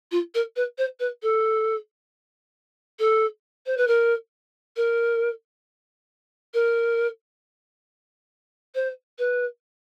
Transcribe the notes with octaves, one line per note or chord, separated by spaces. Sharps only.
F4
A#4
B4
C5
B4
A4
A4
C5
B4
A#4
A#4
A#4
C5
B4